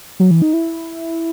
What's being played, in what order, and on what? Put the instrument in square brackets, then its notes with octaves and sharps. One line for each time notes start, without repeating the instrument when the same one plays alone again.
[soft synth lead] F#3
E3
D#4
E4